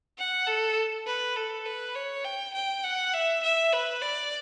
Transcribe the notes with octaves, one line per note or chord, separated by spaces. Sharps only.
F#5
A4
B4
A4
B4
C#5
G5
G5
F#5
E5
E5
B4
D5